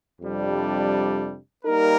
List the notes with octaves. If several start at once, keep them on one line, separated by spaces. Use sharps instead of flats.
F2 C3 G3 D4
G3 A#3 D#4 A#4